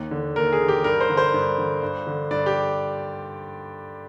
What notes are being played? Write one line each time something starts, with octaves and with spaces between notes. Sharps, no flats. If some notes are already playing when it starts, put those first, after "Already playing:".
Already playing: D#2
D3
D#2 A#4
G#4
D3
G4
G2 A#4
C5
D3
C5
G2
D3
G2
D3
G2 D5
G4